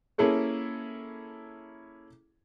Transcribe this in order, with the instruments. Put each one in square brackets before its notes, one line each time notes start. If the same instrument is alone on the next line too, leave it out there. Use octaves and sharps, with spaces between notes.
[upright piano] A#3 C#4 E4 G#4 A4 C#5